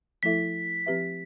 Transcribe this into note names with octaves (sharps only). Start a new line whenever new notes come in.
F3 A3 E4 A4 E5 B6
F3 C4 G4 B4 E5